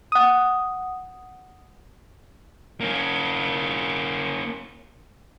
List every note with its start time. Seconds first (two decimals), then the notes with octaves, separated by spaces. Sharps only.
0.12 F#5 D#6
2.81 A#3 C#4